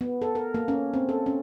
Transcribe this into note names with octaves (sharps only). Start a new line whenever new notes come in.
B3
A4
A#4
A#3
C#4
C4
A4
C#4